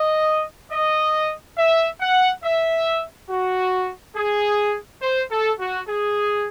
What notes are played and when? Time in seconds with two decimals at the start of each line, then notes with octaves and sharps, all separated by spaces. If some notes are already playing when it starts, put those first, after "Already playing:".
Already playing: D#5
0.72 D#5
1.58 E5
2.01 F#5
2.44 E5
3.30 F#4
4.17 G#4
5.02 C5
5.31 A4
5.60 F#4
5.89 G#4